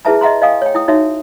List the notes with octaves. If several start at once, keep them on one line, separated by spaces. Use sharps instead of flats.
E4 G#4 B4 E5 A5 A#5
D#5 E5 F#5 A#5 C6
D#5 F5 G5 G#5 D#6
C#5 G5
E4 G5 D#6
D#4 F#4 C#5 E5